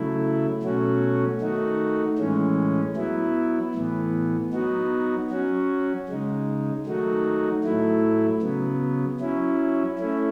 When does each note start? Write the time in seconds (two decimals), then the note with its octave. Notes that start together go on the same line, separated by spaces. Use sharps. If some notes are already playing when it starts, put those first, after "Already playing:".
Already playing: C#3 F#3 A3 E4
0.62 B2 F#3 A3 C#4 F#4
1.40 D#3 A3 D#4 F#4
2.18 A2 E3 G#3 C#4
2.96 F#3 B3 E4
3.74 A2 E3 B3
4.53 F#3 B3 D#4 F#4
5.30 F#3 C#4 F#4
6.09 C#3 G#3 D#4
6.86 D#3 F#3 A3 D#4 F#4
7.64 A2 F#3 A3 E4
8.42 C#3 F#3 B3
9.20 F#3 C#4 E4
9.98 A3 C#4 E4